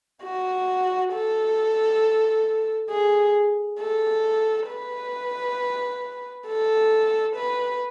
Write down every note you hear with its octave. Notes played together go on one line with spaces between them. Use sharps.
F#4
A4
G#4
A4
B4
A4
B4